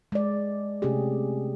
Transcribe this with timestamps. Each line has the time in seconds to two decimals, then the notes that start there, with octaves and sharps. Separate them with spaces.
0.12 G#3 D5
0.82 C3 A3 C#4 G4 G#4